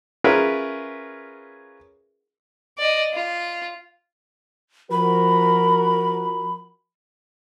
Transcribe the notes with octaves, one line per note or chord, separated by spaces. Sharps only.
C#4 F4 G#4 A#4 B4 E5
D5 D#5
F4
F3 F#4 A#4 B5